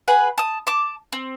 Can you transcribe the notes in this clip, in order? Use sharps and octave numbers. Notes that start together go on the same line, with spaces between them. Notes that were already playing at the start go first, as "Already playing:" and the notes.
G#4 B4 F#5
A5 D#6
A5 D6
C4